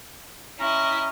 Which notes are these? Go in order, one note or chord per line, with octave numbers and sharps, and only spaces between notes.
C#4 E4 D#5 A#5